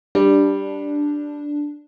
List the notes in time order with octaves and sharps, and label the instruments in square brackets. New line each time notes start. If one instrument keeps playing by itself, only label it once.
[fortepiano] G3 [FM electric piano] D4